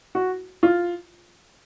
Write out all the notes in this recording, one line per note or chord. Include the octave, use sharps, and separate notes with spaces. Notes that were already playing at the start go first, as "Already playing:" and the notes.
F#4
F4